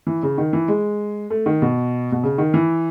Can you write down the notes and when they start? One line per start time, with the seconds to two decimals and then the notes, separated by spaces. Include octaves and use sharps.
0.07 E3
0.23 C#3
0.38 D#3
0.53 E3
0.68 G#3
1.30 A3
1.46 D#3
1.62 B2
2.12 B2
2.23 C#3
2.38 D#3
2.54 E3